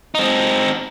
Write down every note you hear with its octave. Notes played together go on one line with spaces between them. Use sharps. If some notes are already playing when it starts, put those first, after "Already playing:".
C4 D#4